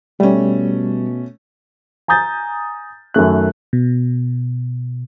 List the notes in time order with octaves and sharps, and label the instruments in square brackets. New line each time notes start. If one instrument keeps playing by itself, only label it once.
[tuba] B2 [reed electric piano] G3 [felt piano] A3 C#4
[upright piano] G#5 A#5 D#6 G6 A6
F#2 D#3 A3 F#6
[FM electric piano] B2